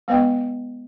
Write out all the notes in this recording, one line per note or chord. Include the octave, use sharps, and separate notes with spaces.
G#3 B3 B4 D#5 G5